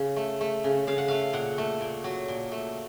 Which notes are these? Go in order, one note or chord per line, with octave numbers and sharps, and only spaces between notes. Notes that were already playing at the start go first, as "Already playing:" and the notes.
Already playing: C#3
A3
A3
C#3
C#3 F5
F#5
A3 F5
A#2 F#5
A3
A#2
F#3
A#2
A3